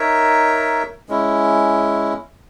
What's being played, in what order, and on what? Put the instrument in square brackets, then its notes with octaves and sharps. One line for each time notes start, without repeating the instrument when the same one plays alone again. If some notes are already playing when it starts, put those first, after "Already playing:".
Already playing: [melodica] D#4 A#4 C#5 E5
G#3 C#4 E4